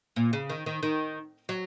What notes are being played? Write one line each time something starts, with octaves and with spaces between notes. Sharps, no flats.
A#2
C#3
D#3
D#3
D#3
F#3